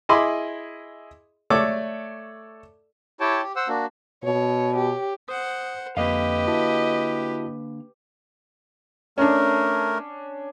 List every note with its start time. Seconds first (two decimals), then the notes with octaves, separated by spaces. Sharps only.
0.09 E4 G#4 D#5 B5 C6 D6
1.50 A3 A4 C#5 D5 D6
3.20 E4 G4 C#5 G5 A5
3.43 G4
3.56 C5 F#5 E6
3.68 A#3 D4 F#4
4.24 B2 C#5
4.76 G4
5.29 C5 F#5 D#6
5.97 F2 D3 A#3 G4 B4 D#5 F5
6.48 E4 F#4 A5
9.18 A3 C#4 D4 A#4